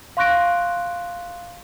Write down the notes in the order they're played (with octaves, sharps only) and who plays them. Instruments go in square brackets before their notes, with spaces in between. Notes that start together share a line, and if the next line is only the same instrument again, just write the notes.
[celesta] F5 C6 C#6 F#6 A#6 D7